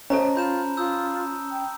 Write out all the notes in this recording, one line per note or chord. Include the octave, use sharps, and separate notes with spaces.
C#4 A4 C5 C#5 D#5 A5 A#5
F4 B5 G6 E7
F4 D#6 E6 G6
G5